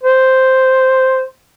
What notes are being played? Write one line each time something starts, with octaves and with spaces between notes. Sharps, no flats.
C5